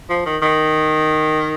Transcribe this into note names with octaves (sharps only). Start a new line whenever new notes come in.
F3
D#3
D#3